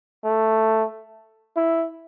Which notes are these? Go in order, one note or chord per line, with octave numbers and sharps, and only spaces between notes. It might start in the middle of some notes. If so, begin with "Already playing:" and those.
A3
E4